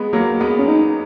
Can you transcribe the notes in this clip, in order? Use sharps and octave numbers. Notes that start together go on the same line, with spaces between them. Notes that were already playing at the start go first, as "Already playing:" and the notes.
Already playing: G#3 B3
F#3 A#3
G#3 B3
C#4
D#4